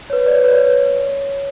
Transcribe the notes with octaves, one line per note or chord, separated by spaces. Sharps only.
C#5
B4
D5
C#5
B4
C#5